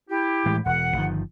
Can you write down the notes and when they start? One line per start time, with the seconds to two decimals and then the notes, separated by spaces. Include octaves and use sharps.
0.10 E4 G4
0.46 A2 E3 G#3
0.66 E1 F#5
0.96 G1 D#3 F3